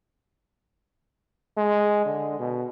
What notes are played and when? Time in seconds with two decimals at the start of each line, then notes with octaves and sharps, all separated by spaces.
1.57 G#3
2.05 D3
2.39 B2